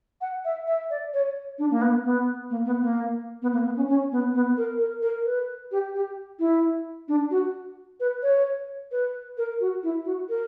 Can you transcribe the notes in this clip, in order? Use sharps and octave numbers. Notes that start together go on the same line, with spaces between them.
F#5
E5
E5
D5
C#5
D4
A#3
B3
B3
A#3
B3
A#3
B3
A#3
B3
C#4
C#4
B3
B3
A#4
A#4
A#4
B4
G4
G4
E4
D4
F#4
B4
C#5
B4
A#4
F#4
E4
F#4
A#4